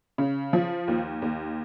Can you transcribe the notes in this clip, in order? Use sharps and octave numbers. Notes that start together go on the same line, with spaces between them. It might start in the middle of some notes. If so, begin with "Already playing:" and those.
C#3
F3
D#2
D#2